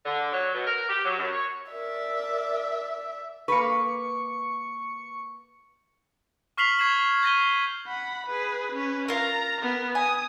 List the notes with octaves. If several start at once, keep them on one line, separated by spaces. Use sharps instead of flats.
D3
F#3
B2
A#4
G4
F#3
F#2
C#5
A#4 D5 E5
A#3 B4 C#6 C#7
C#6 F6 B6 C7 F7 F#7
C#6 G#6 C7 E7 F#7
G6 A#6 D#7 G7
F#5 B5
G#4 B4
C#4 B4
F4 A#4 A#5
B3 A#4
G#5 D#6